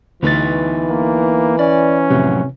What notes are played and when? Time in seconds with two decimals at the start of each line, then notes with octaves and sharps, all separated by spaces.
0.23 D2 E3 B3 D#4 B4 A6
0.89 A#3
1.59 C#4 D5
2.10 F2 A2 C3 F#3